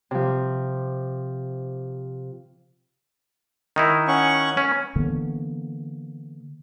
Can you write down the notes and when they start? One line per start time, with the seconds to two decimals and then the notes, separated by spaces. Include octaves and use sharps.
0.11 C3 F3
3.76 D#3 D#4 E4
4.08 C#4 F#5 C#6
4.57 C#4
4.96 D3 E3 A#3 B3